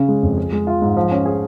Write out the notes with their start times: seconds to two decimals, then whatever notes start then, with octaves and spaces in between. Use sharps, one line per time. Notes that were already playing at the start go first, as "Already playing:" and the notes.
Already playing: C#3 C#4
0.09 G#3
0.23 F2
0.37 G#4
0.53 G#3
0.67 F4
0.82 G#2
0.97 F3
1.11 C#4
1.26 G#4